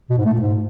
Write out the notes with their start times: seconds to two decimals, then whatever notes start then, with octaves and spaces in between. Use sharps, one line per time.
0.10 B2
0.18 G#2
0.25 A3
0.33 A#2
0.41 G#2